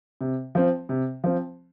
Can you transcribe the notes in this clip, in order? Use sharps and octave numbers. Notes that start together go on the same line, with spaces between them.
C3
F3 C4
C3
F3 C4